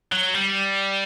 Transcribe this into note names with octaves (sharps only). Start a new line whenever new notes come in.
F#3
G3